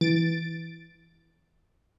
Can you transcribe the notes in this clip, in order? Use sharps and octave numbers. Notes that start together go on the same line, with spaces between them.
E3 A6 D7